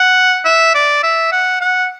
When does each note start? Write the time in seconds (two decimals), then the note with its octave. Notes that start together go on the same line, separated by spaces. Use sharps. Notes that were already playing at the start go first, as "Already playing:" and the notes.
Already playing: F#5
0.45 E5
0.75 D5
1.03 E5
1.32 F#5
1.61 F#5